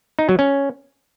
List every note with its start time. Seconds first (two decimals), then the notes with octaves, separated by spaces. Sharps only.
0.19 D#4
0.29 F#3
0.39 C#4